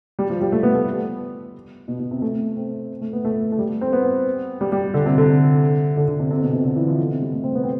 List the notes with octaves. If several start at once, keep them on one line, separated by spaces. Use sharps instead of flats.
G3
F3
G3
A3
B3
A3
B2
B2
C3
A3
C4
A3
B3
A3
A3
G3
C4
B3
G3
G3
D3
C3
D3
D3
D3
C3
C3
B2
C3
D3
E3
F3
C3
G3
A3
C4
B3
C4